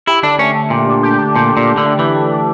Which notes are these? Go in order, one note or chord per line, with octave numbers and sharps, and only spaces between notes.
E4 G4
D3 D4
A3 C#4
A3
A#2 G4
D4
G4
D4
A#2 G4
D4
A#2
G4
D3
A3
E3 G4
D4
D4